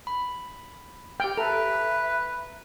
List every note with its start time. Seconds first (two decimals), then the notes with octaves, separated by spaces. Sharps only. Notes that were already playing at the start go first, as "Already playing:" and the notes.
0.07 B5
1.20 G4 G5 F6
1.37 A4 B4 E5 A#5